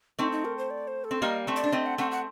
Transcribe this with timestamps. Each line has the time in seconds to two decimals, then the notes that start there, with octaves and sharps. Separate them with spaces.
0.19 A3 C4 D#4
0.32 D#4
0.45 A#4
0.58 C5
0.70 D5
0.88 C5
1.04 A4
1.11 C4
1.22 G3 A#3 D#5
1.47 A3 C4
1.56 D5
1.64 D4
1.72 A3 C4 D#5
1.86 F#5
1.98 A3 C4 F#5
2.11 F#5